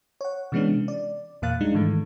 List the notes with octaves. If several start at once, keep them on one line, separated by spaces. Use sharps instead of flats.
C#5 F#5
C3 E3 G#3 B3 C#4 D4
D5
E2 A#2 A#3 F5 F#6 A6
G3 G#3 D4 D#4
G#2 D#3 E3 A3